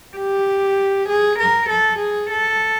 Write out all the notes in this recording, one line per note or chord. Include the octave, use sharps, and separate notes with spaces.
G4
G#4
A#4
A4
G#4
A4